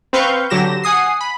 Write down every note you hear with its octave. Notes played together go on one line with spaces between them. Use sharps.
C4 B4 F5 C#6 G6
D3 F#3 G4 A#6 E7
F#5 G#5 D#6 C7
B5